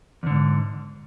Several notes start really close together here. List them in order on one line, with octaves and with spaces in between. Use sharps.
E2 D3 G#2